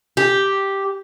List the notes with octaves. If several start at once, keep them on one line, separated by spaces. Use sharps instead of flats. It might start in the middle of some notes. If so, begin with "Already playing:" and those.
G4